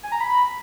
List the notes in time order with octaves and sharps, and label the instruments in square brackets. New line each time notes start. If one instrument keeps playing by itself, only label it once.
[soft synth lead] G#5
A#5
B5